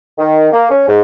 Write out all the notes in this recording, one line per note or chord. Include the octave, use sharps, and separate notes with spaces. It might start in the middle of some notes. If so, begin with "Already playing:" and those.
D#3
A#3
C#4
G#2